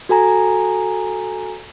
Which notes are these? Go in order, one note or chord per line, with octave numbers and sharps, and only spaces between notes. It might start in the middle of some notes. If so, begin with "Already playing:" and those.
F#4 A4 G#5 A#5